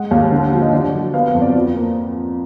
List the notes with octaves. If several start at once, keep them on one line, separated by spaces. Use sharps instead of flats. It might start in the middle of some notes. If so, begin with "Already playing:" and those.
Already playing: G#3 F#5
D#2 F5
D3
F3
D#5
D3 D5
F#3
B3 F5
F5
F2
D5
F3
A#3